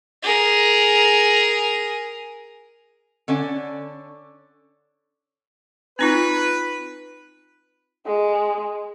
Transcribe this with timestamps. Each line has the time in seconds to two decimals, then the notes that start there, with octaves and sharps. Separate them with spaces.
0.23 G#4 A#4
3.28 D3 C#4 D5
5.99 C4 D#4 F4 B4
8.06 G#3 G#4